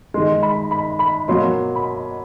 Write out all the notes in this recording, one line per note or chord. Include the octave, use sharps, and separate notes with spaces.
D#3 G#3 C6
B5
B5
B5
B2 F#3 A#3 C6
B5